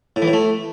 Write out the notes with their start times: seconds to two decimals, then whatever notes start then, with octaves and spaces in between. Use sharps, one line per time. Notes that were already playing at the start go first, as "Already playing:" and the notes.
0.16 A2
0.22 E3
0.28 A2
0.33 A3